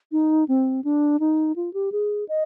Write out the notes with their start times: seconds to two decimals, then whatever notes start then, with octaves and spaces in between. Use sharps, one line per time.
0.12 D#4
0.48 C4
0.84 D4
1.20 D#4
1.56 F4
1.73 G4
1.92 G#4
2.28 D#5